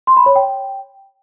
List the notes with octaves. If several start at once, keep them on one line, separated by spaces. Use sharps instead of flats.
C6
B5
C#5
G5